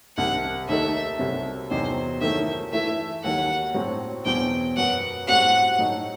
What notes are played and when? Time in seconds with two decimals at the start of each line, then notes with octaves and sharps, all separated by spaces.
0.17 C2 C3 D#3 F#5
0.68 D#2 D#3 A3 D#4 A4 E5
1.19 C2 C3 F#3
1.71 E2 C3 F#3 C4 D#4 C5
2.21 D#3 F#3 A3 E4 A4 E5
2.72 E3 A3 E4 A4 E5
3.23 D#2 D#3 F#3 F#5
3.74 A2 F#3 C4
4.25 E2 B2 F#3 C4 G5
4.76 F#2 F#3 B3 F#4 F#5
5.27 A2 G3 C4 F#4 F#5
5.79 A2 F#3 A3 D#4